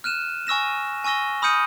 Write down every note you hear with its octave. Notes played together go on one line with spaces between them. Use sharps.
F6 F#6 D#7 E7
G#5 C#6 E6 A#6 E7
G#5 C#6 E6 A#6 G7
B5 D#6 F6 G6 C#7 D#7